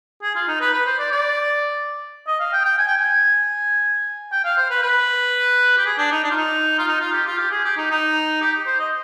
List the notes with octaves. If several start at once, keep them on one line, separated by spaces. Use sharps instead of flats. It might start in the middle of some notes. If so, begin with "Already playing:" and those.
G#4
F4
D#4
B4
B4
C5
D5
D5
D#5
F5
G5
G5
G#5
G5
G#5
G5
F5
C5
B4
B4
G4
G#4
D4
D#4
D4
F4
D#4
F4
D#4
F4
G4
F4
G4
G#4
G4
D#4
D#4
G4
C5
D#5